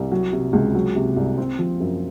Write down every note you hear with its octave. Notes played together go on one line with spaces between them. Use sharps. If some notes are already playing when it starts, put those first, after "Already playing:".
Already playing: C2
F#3
C3
C#2
F#3
C3
C2
C4
F3
F#2